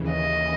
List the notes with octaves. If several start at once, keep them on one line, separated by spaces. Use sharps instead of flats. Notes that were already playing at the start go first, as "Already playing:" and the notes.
Already playing: D#2 C#3 E3
D#5